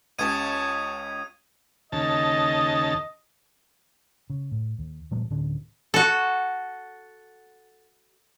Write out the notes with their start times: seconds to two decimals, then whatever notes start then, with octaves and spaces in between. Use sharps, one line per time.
0.19 C#2 C#4 G4 C#5 A5 D#6 G#6 D#7
1.92 D#2 C#3 D#5 A5
4.30 C#3
4.51 A2
4.79 D#2
5.11 A#2 F3 G3 A3
5.30 D1 A2 D3 C#4
5.94 F#4 A4